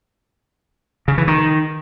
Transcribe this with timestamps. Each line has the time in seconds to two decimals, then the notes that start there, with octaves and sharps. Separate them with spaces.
1.08 C#3
1.18 E3
1.28 D#3